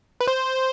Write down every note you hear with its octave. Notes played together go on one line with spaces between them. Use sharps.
B4
C5